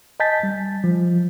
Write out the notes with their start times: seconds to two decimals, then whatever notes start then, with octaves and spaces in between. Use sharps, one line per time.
0.20 D#5 G#5 A5 G6 A6 B6
0.43 G3
0.84 F3